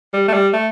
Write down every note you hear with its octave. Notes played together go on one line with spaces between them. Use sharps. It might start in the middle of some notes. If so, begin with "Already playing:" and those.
G3
A3
G3
A3